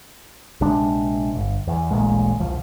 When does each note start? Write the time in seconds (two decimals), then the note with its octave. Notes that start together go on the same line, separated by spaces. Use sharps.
0.60 A#1 C3 G#3 D4
1.35 G1
1.67 E2
1.91 D1 A1 A#2 G#3
2.40 E1 C2 F3